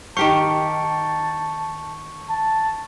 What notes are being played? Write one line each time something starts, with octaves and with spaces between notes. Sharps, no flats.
D#3 G4 F5 A5 C#6 G6 C#7
A5